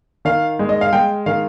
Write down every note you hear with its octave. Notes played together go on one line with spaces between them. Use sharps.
D#3 F5
G#3
D#5
F5
G#3 G5
D#3 F5